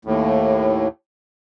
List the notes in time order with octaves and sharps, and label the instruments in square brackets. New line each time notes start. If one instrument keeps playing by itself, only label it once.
[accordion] D#2 A2